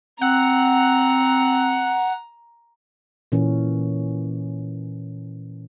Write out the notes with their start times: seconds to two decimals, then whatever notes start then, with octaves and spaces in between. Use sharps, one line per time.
0.21 C4 F#5 A#5
3.32 A#2 E3 C#4 A#4